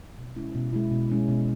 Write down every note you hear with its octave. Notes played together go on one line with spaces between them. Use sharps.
B2
G#3 C#4 E4
B2
G#3 C#4 E4
B2
G#3 C#4 E4
B2